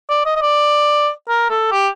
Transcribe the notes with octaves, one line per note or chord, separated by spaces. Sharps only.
D5
D#5
D#5
D5
A#4
A4
G4